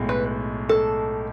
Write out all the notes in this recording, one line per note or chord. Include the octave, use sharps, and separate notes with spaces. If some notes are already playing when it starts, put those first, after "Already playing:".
Already playing: B1 A2 G#3
B4
A4